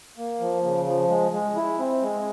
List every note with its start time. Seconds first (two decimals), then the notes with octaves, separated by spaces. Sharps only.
0.18 A#3
0.40 F3
0.64 C#3
0.86 F3
1.09 G#3
1.33 G#3
1.56 E4
1.79 C4
2.02 G#3